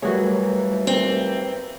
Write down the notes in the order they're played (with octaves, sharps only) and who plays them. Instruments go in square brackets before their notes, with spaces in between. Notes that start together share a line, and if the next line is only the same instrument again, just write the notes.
[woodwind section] D#2 E3 [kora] F#3 F#4 G#4 [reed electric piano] G3 A3 C#5
[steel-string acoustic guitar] C4